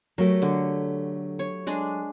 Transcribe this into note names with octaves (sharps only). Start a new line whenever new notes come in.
F#3 A3 G4 A#4
D3
C#5
G#3 D4